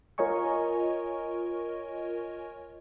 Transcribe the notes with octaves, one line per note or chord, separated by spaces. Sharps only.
F4 A#4 C#5 D#5 G#5 C#6